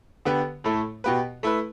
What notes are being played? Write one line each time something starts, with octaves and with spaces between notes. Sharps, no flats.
D3 B3 G4 B4
A2 A3 E4 A4
B2 B3 G4 B4
A3 E4 B4